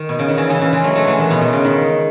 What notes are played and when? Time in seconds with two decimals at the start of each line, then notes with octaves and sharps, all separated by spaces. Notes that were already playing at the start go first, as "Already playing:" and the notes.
Already playing: D#3
0.09 B2
0.19 C#3
0.28 D#3
0.38 C#3 E3
0.49 C#3 E3
0.61 C#3 E3
0.73 E3 G#3
0.84 F#3 A3
0.95 F#3 A3
1.07 E3 G#3
1.19 D#3
1.31 B2
1.41 B2
1.53 C#3
1.65 D#3